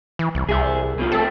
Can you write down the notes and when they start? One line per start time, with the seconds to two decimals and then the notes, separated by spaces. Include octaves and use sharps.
0.19 E3
0.35 C2
0.49 C2 G#4 E5
0.99 B2 F3
1.12 A3 C4 A4